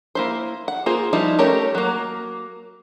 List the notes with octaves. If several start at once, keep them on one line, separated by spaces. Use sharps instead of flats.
A#3 E4 C5
F#5
A#3 F4 G#4 C5
F3 G3 D#4 E4
A3 C#4 G4 A#4 C#5
F#3 A#3